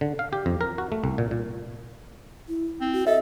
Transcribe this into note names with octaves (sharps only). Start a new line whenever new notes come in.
D3
F5
G4
F2
A#4
F#4
A3
C2
A#2
A#2
E4
C4
F#4
A4 D#5 E5